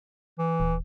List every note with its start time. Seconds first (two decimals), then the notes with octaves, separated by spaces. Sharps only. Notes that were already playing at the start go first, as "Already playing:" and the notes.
0.39 E3
0.60 D#1